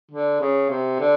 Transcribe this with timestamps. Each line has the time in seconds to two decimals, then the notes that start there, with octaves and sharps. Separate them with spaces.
0.11 D3
0.41 C#3
0.70 C3
1.00 D3